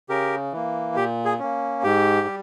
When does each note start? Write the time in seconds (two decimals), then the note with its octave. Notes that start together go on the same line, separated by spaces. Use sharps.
0.09 C#3 G4 A#4
0.53 E3 A#3
0.96 A#2 G4
1.25 G#4
1.39 A#3 C#4
1.83 G#2 G4
2.27 G3